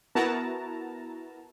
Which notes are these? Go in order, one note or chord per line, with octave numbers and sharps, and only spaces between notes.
B3 E4 F#4 A#4 A5 A#5